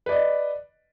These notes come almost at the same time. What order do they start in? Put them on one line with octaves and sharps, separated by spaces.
B4 D5 D#5